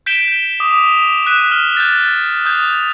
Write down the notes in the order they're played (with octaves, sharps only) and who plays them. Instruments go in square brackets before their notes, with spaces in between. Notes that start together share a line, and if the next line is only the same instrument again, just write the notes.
[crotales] G6 B6 D7 E7 G7
D6 D#6
D#6 F#6 B6 D#7 E7
F6
G6 A6
D#6 G6